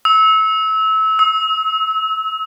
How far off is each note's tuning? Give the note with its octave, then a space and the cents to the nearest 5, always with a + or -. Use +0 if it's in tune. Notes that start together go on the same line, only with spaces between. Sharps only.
E6 -25
E6 -45